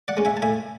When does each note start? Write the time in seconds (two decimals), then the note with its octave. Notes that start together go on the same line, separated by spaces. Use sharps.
0.08 D5 F#5
0.17 G#3 C#4
0.25 E5 G#5
0.37 A5
0.42 A2 E5 G#5